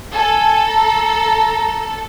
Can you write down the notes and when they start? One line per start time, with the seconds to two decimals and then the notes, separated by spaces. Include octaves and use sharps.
0.12 A4 G#5
0.67 A#5